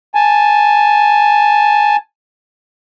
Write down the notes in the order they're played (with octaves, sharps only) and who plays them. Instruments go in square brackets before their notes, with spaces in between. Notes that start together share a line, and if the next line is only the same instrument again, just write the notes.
[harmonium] G#5 A5